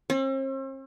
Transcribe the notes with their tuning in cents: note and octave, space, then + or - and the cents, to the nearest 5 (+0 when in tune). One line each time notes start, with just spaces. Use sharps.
C4 +45